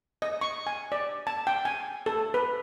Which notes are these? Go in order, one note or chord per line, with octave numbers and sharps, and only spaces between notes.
D#5
C#6
G#5
D5
A5
G5
G#5
A4
B4